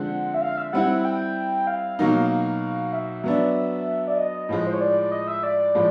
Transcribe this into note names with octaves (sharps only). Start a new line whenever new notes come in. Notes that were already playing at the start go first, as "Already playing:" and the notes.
Already playing: D3 F3 G#3 C4 F#5
E5
F5
E5
G3 C4 E4 F#5
G5
F5
B2 F#3 A#3 D#4
F5
E5
F#3 B3 D4 E5
D5
D#5
A2 F3 G#3
C5
C#5
D5
D5
D#5
E5
D5
A2 F3 G#3